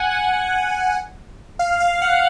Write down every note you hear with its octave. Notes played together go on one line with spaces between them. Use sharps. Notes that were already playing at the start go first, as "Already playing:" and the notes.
Already playing: F#5 G#5
F#5
F5
F5
F#5